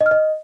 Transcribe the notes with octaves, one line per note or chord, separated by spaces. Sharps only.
D#5
F6
D#5